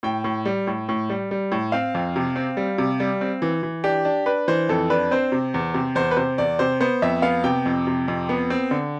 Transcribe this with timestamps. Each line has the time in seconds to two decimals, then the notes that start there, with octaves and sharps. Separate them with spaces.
0.03 A2 G5
0.24 A2
0.45 G3
0.67 A2
0.89 A2
1.10 G3
1.31 G3
1.52 A2
1.72 C4 F5
1.95 F2
2.16 C3
2.36 C4
2.57 G3
2.78 C3
3.00 G3
3.21 C4
3.42 E3
3.63 E3
3.84 D4 G4
4.05 D4
4.26 D4 B4
4.48 E3 C5
4.69 F2 A4
4.90 D4 B4
5.11 C4 C5
5.32 C3
5.54 E2
5.74 C3
5.95 E2 C5
6.11 B4
6.16 C3 C5
6.38 E2 D5
6.59 C3 C5
6.80 B3 C5
7.02 F2 E5
7.22 B3 F5
7.44 C3 G5
7.66 F2
7.87 C3
8.08 F2
8.29 B3
8.50 C4
8.71 D3